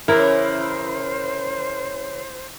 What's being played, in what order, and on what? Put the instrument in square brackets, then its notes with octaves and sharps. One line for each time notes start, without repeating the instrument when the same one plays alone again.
[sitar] C#3 E3 C#4 [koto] E4 [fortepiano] A#4 [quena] C5